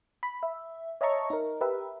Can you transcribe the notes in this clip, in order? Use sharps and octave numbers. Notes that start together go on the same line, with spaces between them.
B5
E5
C#5 D#5 E5 A5 A#5 C#6
D#4 A#4
G4 A#4 B4 E5